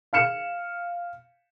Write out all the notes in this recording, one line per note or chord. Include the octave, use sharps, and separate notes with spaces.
F5 F6 C#7 E7